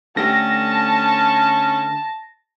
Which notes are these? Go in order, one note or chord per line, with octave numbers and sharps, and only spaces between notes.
D3 A3 C#4 G4 A5 A#6